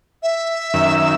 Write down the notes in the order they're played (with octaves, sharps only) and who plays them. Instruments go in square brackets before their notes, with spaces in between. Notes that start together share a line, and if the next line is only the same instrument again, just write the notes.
[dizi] E5
[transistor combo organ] F#2 D#3 E6